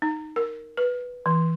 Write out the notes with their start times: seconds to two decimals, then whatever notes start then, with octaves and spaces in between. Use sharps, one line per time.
0.02 D#4
0.36 A#4
0.77 B4
1.26 E3